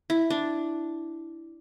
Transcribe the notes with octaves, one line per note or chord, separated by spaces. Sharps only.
E4
D4